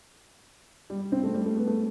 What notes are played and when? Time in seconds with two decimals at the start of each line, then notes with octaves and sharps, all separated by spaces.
0.90 G3
1.12 C4
1.23 A3
1.34 G3
1.46 A3
1.57 B3
1.67 A3